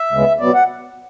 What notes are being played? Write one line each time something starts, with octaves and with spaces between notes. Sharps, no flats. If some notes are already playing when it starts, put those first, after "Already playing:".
Already playing: E5
D2 C#3 G#3 B3
B2 F#3 B3 D5
F#5